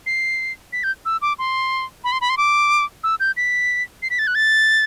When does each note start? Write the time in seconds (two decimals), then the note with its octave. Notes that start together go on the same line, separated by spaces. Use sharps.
0.06 C7
0.73 B6
0.84 G6
1.05 E6
1.22 D6
1.39 C6
2.04 B5
2.12 C6
2.21 B5
2.30 C6
2.37 D6
3.04 E6
3.20 G6
3.37 B6
4.02 C7
4.10 B6
4.19 A6
4.27 F#6
4.35 A6